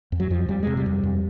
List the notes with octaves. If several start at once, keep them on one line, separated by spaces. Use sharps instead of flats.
F2
F#3
F2 F3
F2 G3
C3 G#3
G3
F2
F2